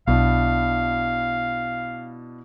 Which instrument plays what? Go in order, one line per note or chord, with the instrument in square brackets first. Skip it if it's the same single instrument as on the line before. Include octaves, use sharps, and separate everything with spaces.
[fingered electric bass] B1 [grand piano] B2 D4 E4 [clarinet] F5